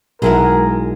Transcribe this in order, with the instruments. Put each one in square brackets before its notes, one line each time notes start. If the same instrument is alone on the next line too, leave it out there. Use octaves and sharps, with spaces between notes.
[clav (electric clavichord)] B1 [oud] G#3 E4 F#4 [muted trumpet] A#4